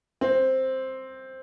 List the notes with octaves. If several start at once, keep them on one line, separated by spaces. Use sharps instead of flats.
C4